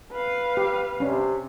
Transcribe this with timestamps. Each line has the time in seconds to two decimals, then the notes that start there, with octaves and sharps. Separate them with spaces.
0.12 B4 F5
0.57 G4
1.00 C3 C#4 D4